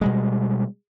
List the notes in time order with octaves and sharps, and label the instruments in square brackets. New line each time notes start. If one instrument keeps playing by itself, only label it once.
[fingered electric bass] B2 G3 G#3